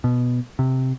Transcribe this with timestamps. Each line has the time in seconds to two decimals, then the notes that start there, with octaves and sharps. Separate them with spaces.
0.04 B2
0.59 C3